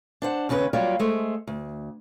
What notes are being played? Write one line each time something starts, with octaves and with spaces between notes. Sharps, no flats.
D4 C5 F#5
D#2 C#3 C#4 G4 B4
F#3 G3 A#3 F4 C#5 D5
G#3 A3 C5
D2